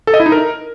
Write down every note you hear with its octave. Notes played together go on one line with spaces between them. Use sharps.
A4
D#5
E4
D#4
A#4